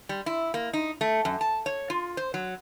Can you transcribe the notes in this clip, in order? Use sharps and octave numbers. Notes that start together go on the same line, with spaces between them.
G3
E4
A#3
D#4
A3
F#2
A5
C#5
F4
C5
F#3